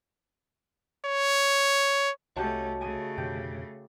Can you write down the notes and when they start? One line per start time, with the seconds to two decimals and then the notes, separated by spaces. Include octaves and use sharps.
1.06 C#5
2.37 C2 A3 C#4 F#4 G4 C#5 D#5 A5
2.81 C#3 A3 G#5 D#6
3.18 F2 B2 D3 G4